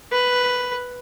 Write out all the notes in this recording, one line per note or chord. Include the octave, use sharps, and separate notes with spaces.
B4